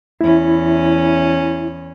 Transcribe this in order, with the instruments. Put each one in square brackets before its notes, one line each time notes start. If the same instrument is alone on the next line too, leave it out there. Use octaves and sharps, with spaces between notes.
[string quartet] E2 C#4 [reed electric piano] E4